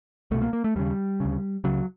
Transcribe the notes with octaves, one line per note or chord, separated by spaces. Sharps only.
C2 B2 A3
A#3
A#3
A3
D#2 C#3 G3
D2 C#3
C#2 C#3 F#3